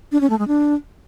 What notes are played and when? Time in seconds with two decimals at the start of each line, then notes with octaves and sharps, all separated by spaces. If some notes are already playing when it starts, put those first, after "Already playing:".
0.12 D4
0.21 C#4
0.30 A3
0.39 G#3
0.48 D4